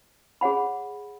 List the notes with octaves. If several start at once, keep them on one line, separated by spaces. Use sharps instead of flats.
G#4 C#5 F#5 B5